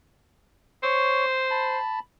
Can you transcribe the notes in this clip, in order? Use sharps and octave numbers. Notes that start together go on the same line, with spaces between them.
C5 C#5 C#6
A5 B5